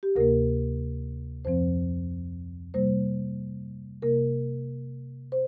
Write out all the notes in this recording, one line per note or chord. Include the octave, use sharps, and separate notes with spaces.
G4
D2 C3 A#3 A#4
F2 F3 C4 C5
C3 G3 A#3 C5
C3 A#3 A#4
C5